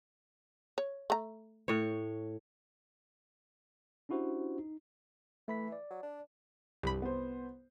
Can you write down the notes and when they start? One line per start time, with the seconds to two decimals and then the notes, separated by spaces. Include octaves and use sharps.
0.78 C#5
1.10 A3 A#5
1.68 A2 C#5
4.09 C#4 D4 E4 F#4 G4 C5
4.59 D#4
5.48 E3 A3 B5 B6
5.72 D5
5.90 F#3
6.03 D4
6.83 C2 G2 B5
7.02 B3 C5